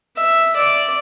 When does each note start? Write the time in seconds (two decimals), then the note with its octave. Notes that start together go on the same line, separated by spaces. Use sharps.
0.18 E5
0.56 D5